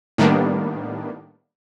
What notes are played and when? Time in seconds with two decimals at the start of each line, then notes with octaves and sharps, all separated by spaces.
0.18 A2 D#3 G3 A#3 B3 D4